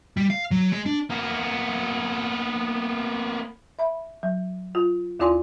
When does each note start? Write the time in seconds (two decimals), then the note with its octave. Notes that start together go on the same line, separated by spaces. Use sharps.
0.17 G3
0.30 F5
0.51 F#3
0.72 G#3
0.86 D4
1.10 A#3 B3
3.79 E5 B5
4.23 F#3
4.75 F4
5.20 D#2 E4 F4 D5 G#5 C6